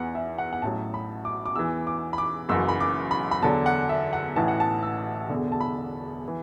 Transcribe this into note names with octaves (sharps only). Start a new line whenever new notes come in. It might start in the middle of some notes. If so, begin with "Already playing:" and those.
Already playing: E2 E3 F#5
E5
F#5
F#5
A1 A2 F#3 A5
B5
D6
D6
E2 E3 E6
D6
B5
D6
F#1 F#2 E3 E6
B5
D6
B5
B5
E2 D3 F#3 A5
F#5
E5
F#5
A1 A2 E3 A5
F#5
A5
E6
E1 E2 D3
A5
B5
E3